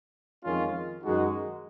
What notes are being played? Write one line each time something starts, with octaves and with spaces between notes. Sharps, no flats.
F2 D#3 G#3 C#4 F4
F#2 D#3 G#3 D#4 F#4